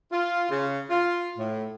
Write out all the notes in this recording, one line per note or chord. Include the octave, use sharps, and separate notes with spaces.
F4
C#3
F4
A2